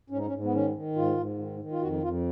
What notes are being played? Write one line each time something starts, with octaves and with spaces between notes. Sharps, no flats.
G#2 C#4
D#4
C#4
G#2
B3
D#3 C#4
D#3
G#2 F4
G#2
D#3
D#3
F4
F2 F#4
F2 F4